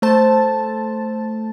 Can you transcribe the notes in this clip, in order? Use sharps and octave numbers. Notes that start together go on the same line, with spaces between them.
A3 C5 A5